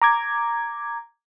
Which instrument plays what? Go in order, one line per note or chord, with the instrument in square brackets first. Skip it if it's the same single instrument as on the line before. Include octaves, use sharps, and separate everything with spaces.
[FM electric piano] A#5 D6 G#6